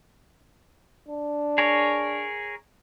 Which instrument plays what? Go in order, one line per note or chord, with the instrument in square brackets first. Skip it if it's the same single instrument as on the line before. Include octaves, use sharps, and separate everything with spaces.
[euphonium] D4
[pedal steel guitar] G#4 A#4 C#5